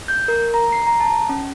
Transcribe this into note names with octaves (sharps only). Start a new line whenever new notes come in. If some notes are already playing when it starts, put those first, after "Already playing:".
G6
A#4
A#5
C7
A#5
A5
C#4